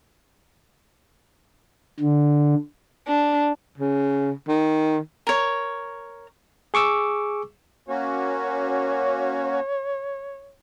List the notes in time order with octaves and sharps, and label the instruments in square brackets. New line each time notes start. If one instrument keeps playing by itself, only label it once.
[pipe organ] D3
[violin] D4
[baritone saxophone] C#3
D#3
[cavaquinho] A#4 C#5
[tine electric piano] G#4 C#6 D6 E6
[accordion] A#3 C#4 F#4 [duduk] C#5